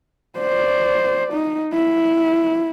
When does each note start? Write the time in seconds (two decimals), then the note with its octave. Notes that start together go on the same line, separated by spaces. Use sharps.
0.39 C5 D5
1.33 D#4
1.73 E4